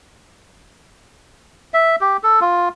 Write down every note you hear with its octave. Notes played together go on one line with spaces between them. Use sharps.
E5
G4
A4
F4